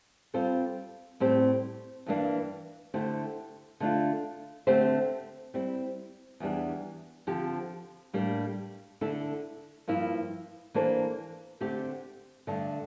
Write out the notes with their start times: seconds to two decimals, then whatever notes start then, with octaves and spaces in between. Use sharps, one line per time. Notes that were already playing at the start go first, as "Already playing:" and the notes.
0.34 G3 C4 F4 A4 C5
1.20 A2 G3 C4 G4 C5
2.06 G2 E3 A#3 D4
2.94 D3 A3 E4 G4 C5
3.80 D3 A3 D4 F4
4.67 D3 A3 C4 G4 C5
5.54 G3 C4 E4
6.40 E2 E3 G3 D4
7.27 D3 F3 C4 G4
8.13 A2 G3 A#3 D4
9.01 D3 A3 E4 A4
9.87 G2 F3 A#3 E4
10.74 E3 A#3 D4 A4 C5
11.61 D3 A3 C4 G4
12.47 G2 D3 A3 D4